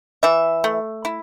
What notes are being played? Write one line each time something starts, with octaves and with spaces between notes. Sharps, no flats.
E3 E5
A3
E4